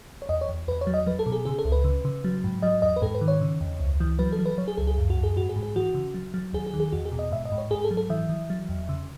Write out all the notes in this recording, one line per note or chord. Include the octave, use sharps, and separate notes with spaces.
C#5
E2 D#5
C#5
E2
E2 B4
C#5
F#3
D#5
F#3 B4
A4
B2
G#4
C#3 G#4
A4
C#2
B4
C#3
C#3
F#3
G#2
F#3 D#5
E2 D#5
B4
G#2 A4
B4
D#3
C#5
C#3
E2
C#2
E3
F#3 B4
A4
F#3
B4
F#3 C#5
G#4
C#2 A4
G#4
F#2
F#4
F#2
G#4
G#2 F#4
G#4
G#2
G#4
E3 F#4
C#3
F#3
F#3
D#2 G#4
G#4
D#3
G#4
E2 F#4
G#4
B2
D#5
G#2 E5
D#5
G#2
C#5
G#2 G#4
A4
F#3
A4
E3 E5
E3
F#3
E2
C#3